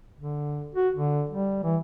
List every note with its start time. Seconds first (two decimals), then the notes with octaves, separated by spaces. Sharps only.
0.19 D3
0.75 F#4
0.95 D3
1.30 G3
1.64 E3